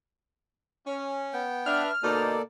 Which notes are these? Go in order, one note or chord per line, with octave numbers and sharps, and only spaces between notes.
C#4
B3 G5
D4 B4 E5 F6
B2 D3 A#3 D#4 A4 C5 D5